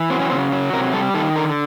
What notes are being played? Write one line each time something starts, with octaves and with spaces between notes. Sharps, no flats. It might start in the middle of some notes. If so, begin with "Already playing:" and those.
Already playing: E3
F#3 C4
C#4
C#3 C4
F#3
C3 A#4
G3 A4
D#3 A4
D3 A#4